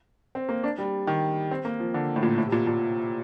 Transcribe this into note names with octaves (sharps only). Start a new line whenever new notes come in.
C4
A#3
D4
G3
D#3
C4
A#3
F3
D3
A2
A#2
A2
C3
A#2
A#2